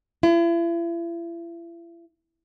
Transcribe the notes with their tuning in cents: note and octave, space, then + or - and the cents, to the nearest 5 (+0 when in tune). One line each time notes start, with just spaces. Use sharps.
E4 +40